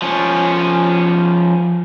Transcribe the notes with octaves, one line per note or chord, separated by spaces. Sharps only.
F3 C#4